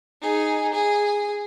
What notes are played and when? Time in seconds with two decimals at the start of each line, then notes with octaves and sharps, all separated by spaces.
0.21 D#4 G#4
0.73 G#4